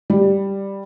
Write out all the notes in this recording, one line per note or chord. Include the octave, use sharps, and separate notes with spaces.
G3